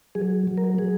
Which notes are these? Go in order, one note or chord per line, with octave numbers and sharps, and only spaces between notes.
F#3 G#4
F#3
A#4
F#3 G#4